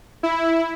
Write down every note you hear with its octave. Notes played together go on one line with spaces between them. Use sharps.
E4